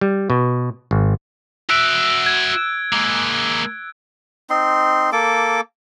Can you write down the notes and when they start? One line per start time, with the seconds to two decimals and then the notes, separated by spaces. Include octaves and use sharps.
0.01 G3
0.30 B2
0.91 G#1
1.70 F#4 E5 E6 F#6 D7
2.26 G#6
2.93 G#3 A#3
4.50 C4 D#4 C6
5.12 A#3 A4 D6